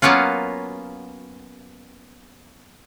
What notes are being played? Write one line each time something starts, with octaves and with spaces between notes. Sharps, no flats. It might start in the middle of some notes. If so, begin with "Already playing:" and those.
F#3 A#3 B3 C#4 F4